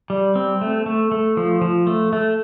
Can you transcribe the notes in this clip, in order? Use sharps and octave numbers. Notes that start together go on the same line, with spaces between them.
G3
C4
A3
A3
A3
F3
F3
A3
A3